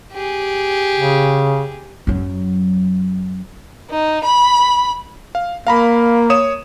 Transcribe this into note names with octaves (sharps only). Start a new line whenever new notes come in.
G4 G#4
C#3
F#2 F#3
D#4
B5
F5
A#3 F5 A#5 B5
C#5 D#6 E7